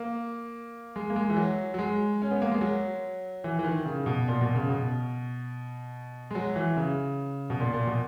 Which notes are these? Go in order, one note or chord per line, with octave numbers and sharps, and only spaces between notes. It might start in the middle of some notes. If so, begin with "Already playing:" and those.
Already playing: A#3
G#3
A#3
G#3
E3
F#3
F#3
G#3
C#4
B3
A#3
G#3
F#3
E3
E3
D#3
C#3
B2
A#2
B2
C#3
B2
G#3
F#3
E3
C#3
B2
A#2
A#2
B2